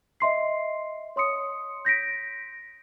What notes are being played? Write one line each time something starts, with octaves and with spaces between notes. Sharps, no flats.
D#5 E5 C6 C7
C#5 C6 D#6 C#7
G6 A#6 B6 D7